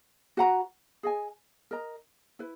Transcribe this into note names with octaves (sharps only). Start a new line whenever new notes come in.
F#4 B4 F#5 A#5
G#4 D#5 G#5
A#4 D#5 A#5
E4 B4